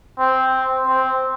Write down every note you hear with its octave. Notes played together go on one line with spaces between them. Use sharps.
C4
C4